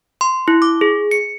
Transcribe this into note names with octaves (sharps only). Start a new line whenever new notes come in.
C6
E4
D6
G#4
C#7